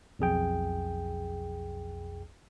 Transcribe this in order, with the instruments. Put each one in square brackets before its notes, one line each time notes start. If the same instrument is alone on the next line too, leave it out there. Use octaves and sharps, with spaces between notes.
[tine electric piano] B1 F2 G#4 G5